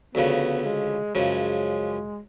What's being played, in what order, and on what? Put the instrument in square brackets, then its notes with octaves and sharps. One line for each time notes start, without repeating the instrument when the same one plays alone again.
[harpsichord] D2 C#3 F3 [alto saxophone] B3
[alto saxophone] G#3
[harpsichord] F#2 C#3 F3 [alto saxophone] G#3